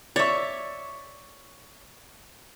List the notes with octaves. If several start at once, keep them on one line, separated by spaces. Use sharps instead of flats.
C#5 D5 E5 C#6 A6